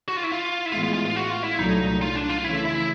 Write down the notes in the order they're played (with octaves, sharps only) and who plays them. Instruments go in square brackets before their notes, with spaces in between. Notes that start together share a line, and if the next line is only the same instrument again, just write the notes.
[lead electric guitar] F#4
F4
E4
F4
E4
[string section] A1 A2 E3 G#3 B3 [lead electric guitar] F4
[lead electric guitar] F4
F4
F4
F#4
F4
E4
[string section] C2 A#2 F#3 A3 [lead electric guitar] D#4
[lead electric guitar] F4
D4
F4
[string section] C#3 E3 A3 [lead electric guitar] E4
[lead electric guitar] E4